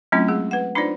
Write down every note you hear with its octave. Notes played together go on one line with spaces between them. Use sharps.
F#3 A3 C4 C#4 E4 F4
G#3 G#4
B4 F#5
D4 D#4 F4 B4 C5 D5